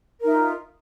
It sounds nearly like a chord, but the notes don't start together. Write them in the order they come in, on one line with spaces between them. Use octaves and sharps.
A#4 D#4 E5 F4